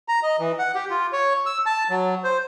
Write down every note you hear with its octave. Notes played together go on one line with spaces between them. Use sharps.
A#5
D#5
E3
F#5
G4
F4
C#5
E6
A5
F#3
C5